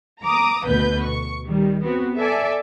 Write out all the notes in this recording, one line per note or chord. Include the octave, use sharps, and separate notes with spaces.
A#5 D6 D#6
D2 B2 B4 G6
C#6
D#3 G3
B3 C4 F#4
A4 D5 E5 G#5